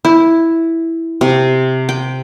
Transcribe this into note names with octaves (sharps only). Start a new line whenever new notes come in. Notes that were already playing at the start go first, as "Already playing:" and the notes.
E4
C3
G5